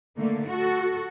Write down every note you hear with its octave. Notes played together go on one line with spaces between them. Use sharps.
D3 A3 A#3
F#4 A4